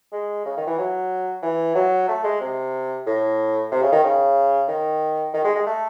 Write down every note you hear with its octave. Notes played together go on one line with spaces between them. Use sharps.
G#3
C#3
D#3
E3
F#3
E3
F#3
A3
G#3
C3
A2
C3
C#3
D#3
C#3
D#3
D#3
G#3
G#3
A3